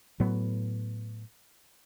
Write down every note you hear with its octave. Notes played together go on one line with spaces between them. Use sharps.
A2 F#3 B3